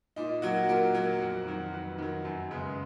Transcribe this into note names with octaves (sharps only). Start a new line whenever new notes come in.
A#2 D#4
F#3 A#3 F#4
A#2 A#4
F#3 A#3
F2
D#3 F#3
F2 B4
D#3 F#3
F#2
C#3 G#3 B3